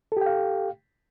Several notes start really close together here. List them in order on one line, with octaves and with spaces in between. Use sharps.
A4 G4 G5 F5